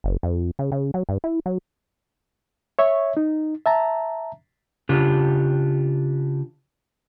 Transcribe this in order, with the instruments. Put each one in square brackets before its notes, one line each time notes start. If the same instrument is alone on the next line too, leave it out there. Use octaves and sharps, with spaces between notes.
[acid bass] F#1
F2
C#3
C#3
F#3
G2
E4
F#3
[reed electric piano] C#5 E5 C#6
D#4
E5 A5 A#5
[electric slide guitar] C#3 D4 F4 G4